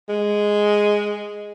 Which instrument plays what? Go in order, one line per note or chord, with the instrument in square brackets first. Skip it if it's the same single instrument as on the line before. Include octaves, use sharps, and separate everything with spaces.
[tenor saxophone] G#3